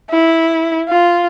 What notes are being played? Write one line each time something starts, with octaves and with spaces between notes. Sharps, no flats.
E4
F4